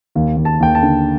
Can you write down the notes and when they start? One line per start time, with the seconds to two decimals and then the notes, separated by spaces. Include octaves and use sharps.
0.15 D#2
0.37 D#2
0.45 A5
0.60 D#2 G5
0.75 A5
0.83 D3